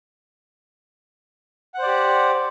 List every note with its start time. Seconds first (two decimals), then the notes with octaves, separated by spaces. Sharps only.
1.74 F#5
1.78 C5
1.82 D5
1.86 G4